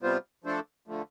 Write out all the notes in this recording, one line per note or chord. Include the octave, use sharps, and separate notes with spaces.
C3 G3 B3 F4 C5
F3 A3 D4 A4 C5
D3 F3 A3